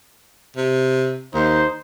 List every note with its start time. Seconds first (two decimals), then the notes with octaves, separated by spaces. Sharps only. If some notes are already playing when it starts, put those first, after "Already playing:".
0.57 C3
1.34 D#2 D#4 C5